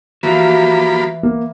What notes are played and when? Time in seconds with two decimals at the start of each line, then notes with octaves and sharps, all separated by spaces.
0.23 E3 F3 A#3 F#4 G4 F5 B5
1.23 A#3